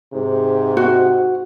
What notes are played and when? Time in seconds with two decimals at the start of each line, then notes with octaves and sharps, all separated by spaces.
0.13 G#2 C3
0.77 F#4